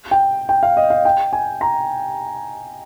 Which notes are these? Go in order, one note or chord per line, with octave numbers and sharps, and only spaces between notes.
G5
G5
F5
D#5
F5
G5
G#5
A#5